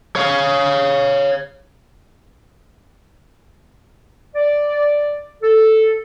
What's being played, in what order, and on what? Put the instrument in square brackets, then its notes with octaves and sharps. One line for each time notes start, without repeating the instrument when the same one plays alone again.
[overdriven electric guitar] C#5 F5
[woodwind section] D5
A4